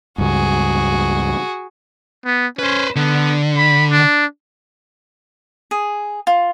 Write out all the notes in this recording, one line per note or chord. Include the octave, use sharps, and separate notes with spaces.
C#2 G2 F#4 G#4
B3
C#4 B4 C5
D3 B3
B5
D4
G#4
F4